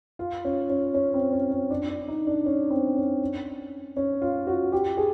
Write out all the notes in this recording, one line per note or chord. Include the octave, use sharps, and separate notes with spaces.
F4
C#4
C#4
C#4
C4
C#4
C#4
D4
D4
D#4
D4
C#4
C4
C#4
C#4
F4
F#4
G4
G#4